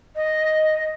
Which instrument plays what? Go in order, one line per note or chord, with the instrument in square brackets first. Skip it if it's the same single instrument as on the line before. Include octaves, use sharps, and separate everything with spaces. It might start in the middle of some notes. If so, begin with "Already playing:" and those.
[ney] D#5